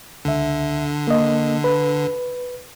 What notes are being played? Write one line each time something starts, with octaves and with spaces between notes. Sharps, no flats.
C#2 D3 E5
A#3 D#5
B4